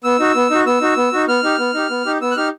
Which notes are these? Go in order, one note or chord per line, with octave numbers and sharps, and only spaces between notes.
B3 E6
D#4 F#4
B3
D#4 F#4
B3 E6
D#4 F#4
B3
D#4 F#4
B3 F6
D#4 G4
B3
D#4 G4
B3
D#4 G4
B3 E6
F#6
D#4 G4 F6